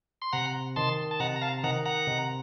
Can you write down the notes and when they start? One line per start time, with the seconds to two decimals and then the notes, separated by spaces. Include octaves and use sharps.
0.22 C6
0.33 C3 F#5 A#5
0.76 D#3 A5 C6
1.11 A5
1.20 C3 F#5 A#5
1.36 A#5
1.42 F5 A5
1.64 D#3 F#5 A#5
1.86 F#5 A#5
2.07 C3